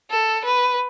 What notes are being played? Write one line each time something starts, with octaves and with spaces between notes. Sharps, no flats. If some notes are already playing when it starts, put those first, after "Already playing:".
A4
B4